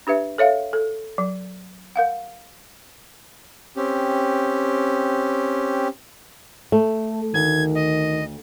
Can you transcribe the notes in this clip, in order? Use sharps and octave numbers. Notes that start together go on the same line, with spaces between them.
D4 G4 B4 E5
A4 C#5 E5 F5
A4
F#3
A#4 F5 F#5
C4 C#4 G4
A3
D2 D#3 G#6
D#5